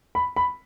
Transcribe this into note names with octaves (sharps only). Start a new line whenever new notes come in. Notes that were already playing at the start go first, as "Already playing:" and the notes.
B5
B5